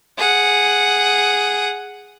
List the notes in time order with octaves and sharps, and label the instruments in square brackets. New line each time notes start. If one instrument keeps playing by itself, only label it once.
[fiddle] G#4 F#5